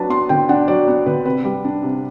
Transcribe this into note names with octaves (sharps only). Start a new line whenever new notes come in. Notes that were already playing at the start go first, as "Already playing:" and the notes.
Already playing: F#3 D4 B4 A5
B3 C6
D3 G5
D4 F#5
F#3 D5
B3
D3 B4
C3 B4
G3
D4
C3